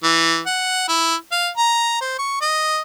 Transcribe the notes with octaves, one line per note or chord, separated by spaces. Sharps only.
E3
F#5
E4
F5
A#5
C5
C#6
D#5